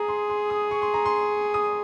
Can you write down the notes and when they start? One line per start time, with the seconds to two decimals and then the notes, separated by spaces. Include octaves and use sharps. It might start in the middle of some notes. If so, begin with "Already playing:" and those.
Already playing: G#4 A#5 D#6
0.08 C6
0.30 C6
0.50 D#6
0.71 C#6
0.82 C6
0.94 A#5
1.05 C6
1.54 D#6